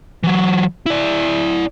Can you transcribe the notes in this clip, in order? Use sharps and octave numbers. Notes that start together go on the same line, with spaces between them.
E3 F#3
E4 D5